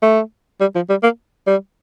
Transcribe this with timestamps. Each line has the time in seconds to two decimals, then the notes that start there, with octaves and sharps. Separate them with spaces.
0.02 A3
0.60 G3
0.75 F3
0.90 G3
1.03 A#3
1.47 G3